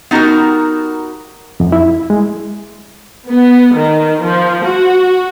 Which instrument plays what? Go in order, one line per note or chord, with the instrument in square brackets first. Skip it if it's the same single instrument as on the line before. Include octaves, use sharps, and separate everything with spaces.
[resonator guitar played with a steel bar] B3 D#4 F#4 G4 A#4
[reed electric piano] F2
E4
G#3
[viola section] B3
D#3
F3
F#4